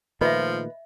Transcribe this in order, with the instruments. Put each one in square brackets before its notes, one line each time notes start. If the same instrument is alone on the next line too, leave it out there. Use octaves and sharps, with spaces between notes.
[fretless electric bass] A#2 D#3 A3 [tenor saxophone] F3 [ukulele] B4 [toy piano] D#5 E5